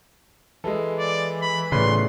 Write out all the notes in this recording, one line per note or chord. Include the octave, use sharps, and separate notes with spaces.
E3 G#3 A4
D5
B5
A2 C#3 B4 D5 B5 C6